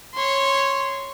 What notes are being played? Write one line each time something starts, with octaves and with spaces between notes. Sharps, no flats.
C#5 C6